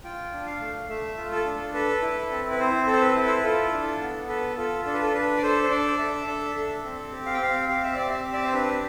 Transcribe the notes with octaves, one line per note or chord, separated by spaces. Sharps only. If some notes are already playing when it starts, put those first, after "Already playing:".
F4 G5
D4
F5
A3
A3 E5
F4
A4
D4
A4 B4
E4
C4
B4
C4 C5
A4
C5
B4
E4
C5
B4
F4 A4
D4
B3
A4 B4
F4 A4
D4 A4
B4
A4
D4 B4
D5
A4 C5
C5
D4 D5
A4 E5
D4
A4
C4
G4
F5
G5
C4 F5
G4 F5
E5
C4 D5
E5
G4
D5
C5
D4 B4